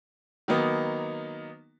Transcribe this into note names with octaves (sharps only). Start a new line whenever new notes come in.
D#3 F#3 A#3 B3 D#4